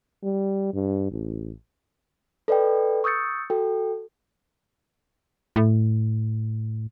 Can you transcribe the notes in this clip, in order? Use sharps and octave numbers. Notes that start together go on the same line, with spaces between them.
G3
G2
A1
A4 B4 D5 D#5 G5
C#6 D#6 E6 G6 A6 C#7
F#4 A4 G5
A2